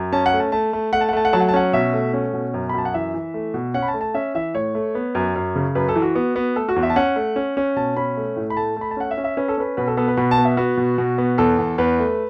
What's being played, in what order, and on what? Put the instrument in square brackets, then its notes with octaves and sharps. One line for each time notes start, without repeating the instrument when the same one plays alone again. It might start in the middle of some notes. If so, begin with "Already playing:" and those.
Already playing: [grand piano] F#2
C#4 A5
F#5
A3
A5
A3 A5
A3
A3 F#5
A5
F#5
A3 A5
F#5
F#3 A5
F#5
A5
C#4 F#5
B2 E5
A3
C#4
B2
F#2
B5
F#2 A5
F#5
E3 E5
E3
A3
B2
C#4 F#5
B5
A5
A3
A5
C#4 E5
E3 E5
A2 C#5
A3
B3
F#2
F#2
C#3
F#2 B4
A4
E3
F#4
B3
B3
A3 A4
F#4
E2
E5
A5
C#4 F#5
A3
C#4
C#4
B2 A5
C#4 B5
A3
A2
B5
A3 A5
A3 B5
A5
C#4 F#5
E5
C#4
E5
C#4 B4
A4
C#4 B4
B2 B4
A4
B3 A4
B4
B2 B5
A5
B3
E5
B3 F#4
B2
B2
B3
E2 A4
E2
E2 B4
A3